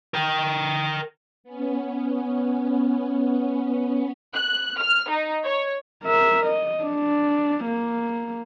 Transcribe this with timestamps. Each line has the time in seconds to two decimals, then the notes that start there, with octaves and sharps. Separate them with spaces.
0.14 A#4 G5
1.44 B3 C#4
4.34 F#6
4.79 F6
5.10 D#4
5.44 C#5
6.04 A#4 E5
6.46 D#5
6.83 D4
7.64 A#3